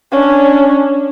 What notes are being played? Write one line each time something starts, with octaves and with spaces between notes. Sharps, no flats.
C#4 D4